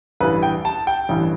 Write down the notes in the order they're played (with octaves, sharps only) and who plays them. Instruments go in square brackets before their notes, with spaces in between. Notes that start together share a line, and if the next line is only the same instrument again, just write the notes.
[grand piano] A1 G2 E3 B4
G5
A5
G5
A1 G2 E3